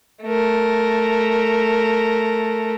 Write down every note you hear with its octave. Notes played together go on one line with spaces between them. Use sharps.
A3 A#4